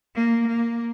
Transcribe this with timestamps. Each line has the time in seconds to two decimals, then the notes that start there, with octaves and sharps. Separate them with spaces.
0.15 A#3
0.47 A#3